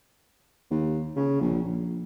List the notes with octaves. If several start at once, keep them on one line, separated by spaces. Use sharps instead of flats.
D#2
C#3
A#1
A#1